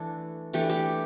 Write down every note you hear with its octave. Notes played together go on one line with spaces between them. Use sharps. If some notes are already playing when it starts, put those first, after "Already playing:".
Already playing: E3 A3 D4 A4
E3 A3 D4 G4
G4